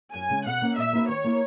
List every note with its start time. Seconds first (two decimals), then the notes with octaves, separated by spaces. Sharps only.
0.14 F#2 G#5
0.30 C#3 G#3 C#4
0.46 B2 F#5
0.62 A#3 C#4
0.77 A#2 E5
0.93 A#3 D#4 F#4 B4
1.09 D#3 C#5
1.24 A#3 E4 A#4